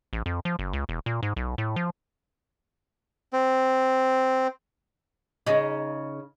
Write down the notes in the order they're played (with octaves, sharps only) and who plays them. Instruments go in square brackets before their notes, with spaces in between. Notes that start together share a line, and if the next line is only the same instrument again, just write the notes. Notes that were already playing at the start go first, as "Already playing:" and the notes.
[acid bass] A1
F2
F3
F#1
C#2
E1
A#2
G#2
B1
A2
F3
[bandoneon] C4
[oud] C#3 D#4